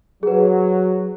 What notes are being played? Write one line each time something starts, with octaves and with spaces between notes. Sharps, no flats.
F#3 G#4 B4